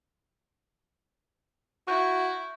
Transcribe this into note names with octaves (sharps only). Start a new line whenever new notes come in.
E4 F#4 C#6 F#6 G6